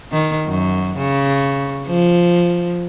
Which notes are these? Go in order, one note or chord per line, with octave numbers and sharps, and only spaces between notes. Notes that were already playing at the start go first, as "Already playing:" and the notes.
D#3
F#2
C#3
F3